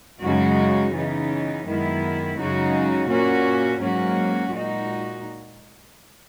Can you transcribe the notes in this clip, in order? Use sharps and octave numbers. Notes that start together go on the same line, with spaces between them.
F#2 C#3 G#3 D#4 F#4
C#3 E3 B3 D#4
F#2 D#3 G#3 B3 E4
F#2 C#3 G#3 D#4 F#4
A#2 A#3 C#4 F#4
G#2 F#3 A#3 C#4 F#4
A#2 G#3 D#4 F#4